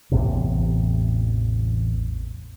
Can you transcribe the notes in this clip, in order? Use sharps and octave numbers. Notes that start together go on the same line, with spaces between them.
A1 E2 A2 C3